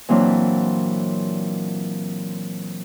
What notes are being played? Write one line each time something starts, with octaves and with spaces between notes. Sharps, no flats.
A#2 E3 F#3 A#3 C4 D4